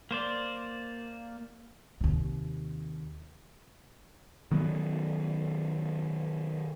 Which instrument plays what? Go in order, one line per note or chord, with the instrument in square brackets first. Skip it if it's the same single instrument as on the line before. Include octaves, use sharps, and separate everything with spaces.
[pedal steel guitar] A#3 C5 D5
[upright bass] D#2 C3
[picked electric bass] D#3 F#3 B3